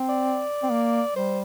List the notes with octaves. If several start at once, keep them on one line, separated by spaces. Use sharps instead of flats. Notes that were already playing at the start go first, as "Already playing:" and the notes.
Already playing: C4
D5
C4
A#3
G3 C5